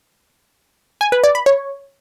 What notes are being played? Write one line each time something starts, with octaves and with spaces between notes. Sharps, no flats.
G#5
B4
D5
B5
C#5